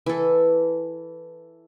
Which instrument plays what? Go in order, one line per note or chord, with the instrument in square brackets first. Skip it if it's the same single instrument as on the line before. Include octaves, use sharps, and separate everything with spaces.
[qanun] E3 A4